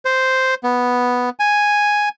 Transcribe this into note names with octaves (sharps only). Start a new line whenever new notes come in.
C5
B3
G#5